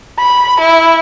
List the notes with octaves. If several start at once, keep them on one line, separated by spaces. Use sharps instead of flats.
B5
E4